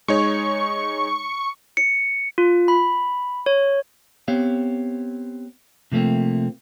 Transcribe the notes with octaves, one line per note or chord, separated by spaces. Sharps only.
G#3 D#4 C#5 C#6
C#7
F4
B5
C#5
B3 C4 G4 C#5 F5
C3 F3 A3 A#3 C4